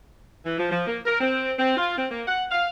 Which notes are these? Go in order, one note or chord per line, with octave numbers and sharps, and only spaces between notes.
E3
F3
F3
A#3
A#4
C4
C4
F4
C4
A#3
F#5
F5